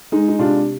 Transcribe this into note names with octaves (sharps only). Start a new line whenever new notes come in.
G#3 D#4
D#4
C3 D4 F4